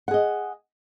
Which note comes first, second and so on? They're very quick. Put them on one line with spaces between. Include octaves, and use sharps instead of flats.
F#5 G#4 D#5